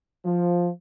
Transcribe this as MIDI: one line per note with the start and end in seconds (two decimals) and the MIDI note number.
0.25 0.70 53